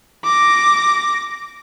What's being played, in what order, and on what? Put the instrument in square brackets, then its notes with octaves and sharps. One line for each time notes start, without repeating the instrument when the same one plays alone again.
[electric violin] D6 A#6